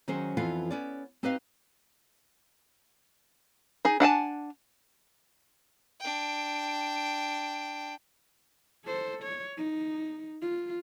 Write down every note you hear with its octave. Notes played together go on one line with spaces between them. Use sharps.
D#3 F#3 C#4 G#4 C5
F2 E3 B3 F4 A4 F5
B3 C#4 D5
C4 D#4 G4 B4 D#5 F5
D#4 G#4
D4 F#5 G#5 A5
D4 G5
A4 C5
C#5
D#4
F4